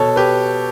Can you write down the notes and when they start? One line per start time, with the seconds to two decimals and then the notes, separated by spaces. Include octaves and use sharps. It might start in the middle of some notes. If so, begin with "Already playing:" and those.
Already playing: B2 A4 C#5
0.16 G4 B4